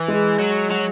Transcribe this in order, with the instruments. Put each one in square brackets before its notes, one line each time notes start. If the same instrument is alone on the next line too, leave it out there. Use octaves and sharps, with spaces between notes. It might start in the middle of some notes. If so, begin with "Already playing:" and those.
Already playing: [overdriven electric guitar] E3
[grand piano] G#3
[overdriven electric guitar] F#3
F#3